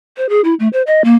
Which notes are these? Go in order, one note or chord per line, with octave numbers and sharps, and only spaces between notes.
C5
G#4
E4
A3
C5
D#5
A#3